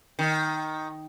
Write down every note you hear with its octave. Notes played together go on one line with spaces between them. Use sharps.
D#3